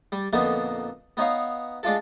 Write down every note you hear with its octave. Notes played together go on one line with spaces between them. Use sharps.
G3
F2 A#2 D3 B3 D#4
B3 D#4 C#5 F5
G#3 D4 F4 A4